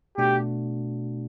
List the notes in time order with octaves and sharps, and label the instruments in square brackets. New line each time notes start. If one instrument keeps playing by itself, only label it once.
[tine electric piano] B2 A3 D4 F#4 [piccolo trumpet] G4